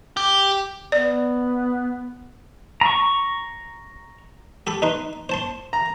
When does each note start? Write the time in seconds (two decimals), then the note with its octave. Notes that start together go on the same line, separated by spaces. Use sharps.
0.17 G4
0.92 B3 D5
2.81 A#5 C#6
4.67 G4 A4 B5
4.82 D#4 B4 C6
5.29 C5 A5 C6
5.73 A#5